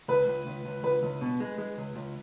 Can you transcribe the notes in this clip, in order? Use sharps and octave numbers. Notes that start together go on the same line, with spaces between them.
C#2 B4
C#2
C#2
C#2
C#2 B4
C#2
B2
G#3
G#3
C#2
C#2